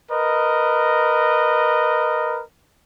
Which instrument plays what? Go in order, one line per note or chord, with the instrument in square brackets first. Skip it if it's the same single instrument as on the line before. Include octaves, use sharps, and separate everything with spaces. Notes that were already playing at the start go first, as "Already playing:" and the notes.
[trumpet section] A#4 B4 D#5